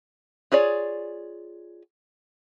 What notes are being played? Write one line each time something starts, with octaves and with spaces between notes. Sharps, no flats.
F4 G#4 C#5 D5